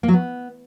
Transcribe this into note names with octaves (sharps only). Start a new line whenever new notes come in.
A#3
F#3
B3